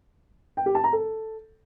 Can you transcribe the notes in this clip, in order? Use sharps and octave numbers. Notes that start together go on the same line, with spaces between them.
G5
G4
A5
A#5
A4